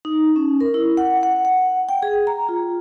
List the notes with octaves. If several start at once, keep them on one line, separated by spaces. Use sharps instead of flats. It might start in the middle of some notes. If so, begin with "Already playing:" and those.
D#4
C#4
A#4
E4
F#5
F#5
F#5
G5
G#4
A#5
F4